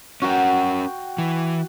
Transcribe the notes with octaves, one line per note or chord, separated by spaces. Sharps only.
C#4 F#4 A#4 G5
E3